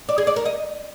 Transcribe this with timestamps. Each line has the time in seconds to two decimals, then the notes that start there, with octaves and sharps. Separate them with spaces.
0.09 D5
0.18 G#4
0.27 D5
0.36 A#4
0.45 D#5